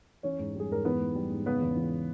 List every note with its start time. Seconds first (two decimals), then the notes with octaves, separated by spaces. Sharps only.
0.23 E3 C#4 C#5
0.39 G#2
0.55 G3 G#4
0.70 G#2 A#4
0.85 E3 B3 B4
1.00 G#2
1.15 G3
1.31 G#2
1.45 C#3 B3 B4
1.61 E2
1.76 E3